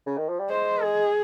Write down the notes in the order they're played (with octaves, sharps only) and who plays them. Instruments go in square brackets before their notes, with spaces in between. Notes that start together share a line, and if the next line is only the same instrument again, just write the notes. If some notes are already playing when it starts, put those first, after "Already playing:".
[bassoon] C#3
D#3
F3
G3
[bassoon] G#3 [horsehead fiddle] C5
[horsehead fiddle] G#4